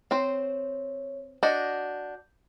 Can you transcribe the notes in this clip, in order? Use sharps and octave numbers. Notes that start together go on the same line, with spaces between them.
C4 C5 C#5
D4 F#4 D#5 G6